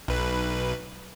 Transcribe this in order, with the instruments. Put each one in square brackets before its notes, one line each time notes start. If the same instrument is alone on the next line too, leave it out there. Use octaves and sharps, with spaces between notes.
[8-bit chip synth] B1 B4